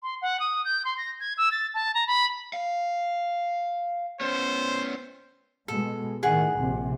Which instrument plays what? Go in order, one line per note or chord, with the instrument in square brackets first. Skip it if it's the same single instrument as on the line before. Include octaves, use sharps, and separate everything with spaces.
[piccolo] C6
F#5
D#6
G6
C6
A#6
G#6
E6
A6
A5
A#5
B5
[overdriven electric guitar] F5
[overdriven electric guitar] B3 C#4 [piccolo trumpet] C5
[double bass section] B2 G#3 [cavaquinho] A4
[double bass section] A2 D#3 [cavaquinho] G#4 F#5
[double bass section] A#1 C3